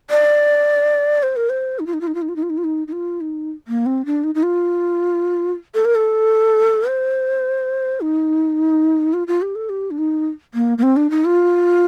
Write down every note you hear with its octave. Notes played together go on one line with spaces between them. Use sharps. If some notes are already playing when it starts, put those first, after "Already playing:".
D5
C5
A#4
C5
D#4
F4
D#4
F4
D#4
F4
D#4
F4
D#4
F4
D#4
F4
D#4
D#4
F4
D#4
A#3
C4
D4
D#4
D#4
F4
A4
A#4
A4
C5
D#4
F4
F4
G4
A4
G4
D4
D#4
A#3
A#3
C4
D4
D#4
F4